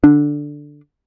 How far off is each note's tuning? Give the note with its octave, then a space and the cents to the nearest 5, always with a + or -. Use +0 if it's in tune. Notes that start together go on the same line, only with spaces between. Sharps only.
D3 +0 D4 +0